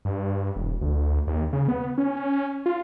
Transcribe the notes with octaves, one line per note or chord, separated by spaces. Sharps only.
G2
E1
D2
D#2
C#3
B3
C#4
F4